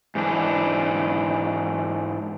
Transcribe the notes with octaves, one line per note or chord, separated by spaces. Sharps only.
G#2 E3 D4